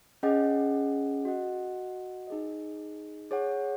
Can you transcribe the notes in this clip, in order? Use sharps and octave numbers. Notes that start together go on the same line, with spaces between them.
C#4 G#4 D#5 F#5
F#4 D#5 F#5
D#4 G#4 D#5
G#4 C#5 F#5